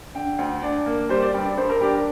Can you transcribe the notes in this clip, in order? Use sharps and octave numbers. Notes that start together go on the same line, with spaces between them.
D3 G5
D2
D4
A#3
G3 C5
D5
G2 G5
D5
G2 C5
A#4
D4 G4
A#4